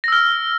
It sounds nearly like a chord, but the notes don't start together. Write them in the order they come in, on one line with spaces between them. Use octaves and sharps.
A#6 E6 F6